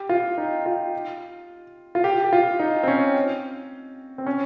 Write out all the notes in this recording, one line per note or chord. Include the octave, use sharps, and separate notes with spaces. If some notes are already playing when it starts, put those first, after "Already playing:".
Already playing: G4
F4
D#4
F4
F4
G4
G4
F4
D#4
C4
C#4
C4
C#4